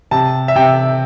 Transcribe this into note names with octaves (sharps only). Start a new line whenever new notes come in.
C3 A5
E5
C3 G5